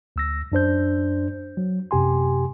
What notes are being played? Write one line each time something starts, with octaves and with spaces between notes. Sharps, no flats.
D2 E6 A#6
F#2 D4 C5 G6
F#3
F#2 C3 G4 G#5 C6